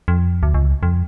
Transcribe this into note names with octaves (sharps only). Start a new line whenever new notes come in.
F2
D2
C#2
F2